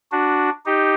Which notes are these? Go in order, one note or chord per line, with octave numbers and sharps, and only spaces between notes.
D4 F#4
D#4 G4